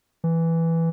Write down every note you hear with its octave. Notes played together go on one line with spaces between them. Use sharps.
E3